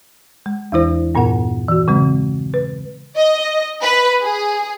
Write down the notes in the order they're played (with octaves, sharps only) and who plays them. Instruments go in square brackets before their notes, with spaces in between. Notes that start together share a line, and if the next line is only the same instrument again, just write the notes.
[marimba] G#3
E2 E3 E4 C5
G2 A#2 B3 A#4 F#5
E3 F#4
C#3 F#3 G#3 C4
B4
[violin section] D#5
B4
G#4